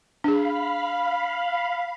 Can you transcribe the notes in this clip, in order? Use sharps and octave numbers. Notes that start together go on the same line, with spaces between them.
D4 G#4 F5 B5